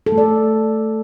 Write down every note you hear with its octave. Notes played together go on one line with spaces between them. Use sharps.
A4
A3
D5